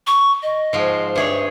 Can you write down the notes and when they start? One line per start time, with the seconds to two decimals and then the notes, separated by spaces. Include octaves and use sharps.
0.07 C#6
0.43 D#5
0.73 G#2 F3
1.16 G2 G#4 C#5 E5